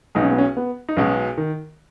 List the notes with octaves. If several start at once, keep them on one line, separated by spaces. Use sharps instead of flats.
B1 B2 G#3 D#4
C#4
B3
C#4
B3
D#4
B1 B2 G#3 C#4
D#3